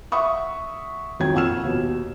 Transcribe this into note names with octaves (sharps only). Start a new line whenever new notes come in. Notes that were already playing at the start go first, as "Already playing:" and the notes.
E5 F#5 C#6 D#6
F2 D#3 F#3 G5 G#6
F2 A#2 F#5 E6 F6 E7
D#2 B2